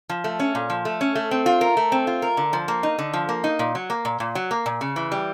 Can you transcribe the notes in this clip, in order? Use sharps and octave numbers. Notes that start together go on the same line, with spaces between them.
F3
A3
C#4
A#2
F3
A3
C#4
A3
C4
F4
A#4
A3
C4
F4
A#4
D3
F3
A#3
D#4
D3
F3
A#3
D#4
A#2
F#3
A#3
A#2
A#2
F#3
A#3
A#2
C#3
E3
G3